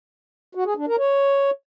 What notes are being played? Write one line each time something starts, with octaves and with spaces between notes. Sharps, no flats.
F#4
G#4
D4
A#4
C#5